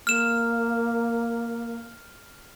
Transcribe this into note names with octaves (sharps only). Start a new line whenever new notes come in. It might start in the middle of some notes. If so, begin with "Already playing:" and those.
A#3 F6 E7